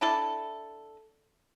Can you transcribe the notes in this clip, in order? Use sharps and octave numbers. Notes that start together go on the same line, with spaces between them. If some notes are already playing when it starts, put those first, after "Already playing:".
D4 E4 A4